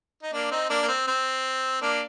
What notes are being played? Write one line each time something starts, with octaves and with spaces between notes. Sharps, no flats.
D#4
A#3 D4
C4 D#4
A#3 D4
A#3
C4
C4
A#3 D4